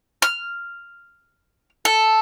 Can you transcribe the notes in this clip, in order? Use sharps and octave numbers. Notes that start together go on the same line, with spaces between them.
F6
A4